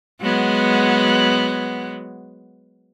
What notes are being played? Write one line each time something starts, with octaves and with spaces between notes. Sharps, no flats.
F#3 G#3 B3